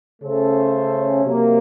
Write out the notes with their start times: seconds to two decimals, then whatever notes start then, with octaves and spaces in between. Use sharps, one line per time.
0.21 C#3 A3 C#4 A4 C5
1.24 C3 F#3 A#3